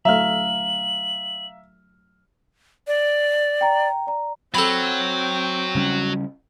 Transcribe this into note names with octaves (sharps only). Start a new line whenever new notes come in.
F#3 A3 E5 F5 A#5 F6 F#7
D5
G5 A#5
D5 A#5
F#3 C4 A4 G5 B5
C#3 G3 C#4